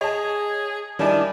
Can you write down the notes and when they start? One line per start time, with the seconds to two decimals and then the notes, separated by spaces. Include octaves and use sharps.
0.01 G#4 C#5 D#5 A5
0.99 D#3 G3 D4 E4 D5 G#5 D6